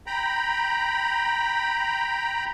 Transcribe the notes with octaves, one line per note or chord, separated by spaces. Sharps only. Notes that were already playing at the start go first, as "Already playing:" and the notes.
G5 A#5 B5